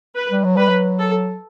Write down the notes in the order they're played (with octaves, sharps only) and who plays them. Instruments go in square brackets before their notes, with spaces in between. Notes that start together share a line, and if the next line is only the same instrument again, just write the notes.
[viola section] B4
[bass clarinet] G3
F#3
[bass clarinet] G3 [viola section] B4
[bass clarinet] F#3
[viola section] A4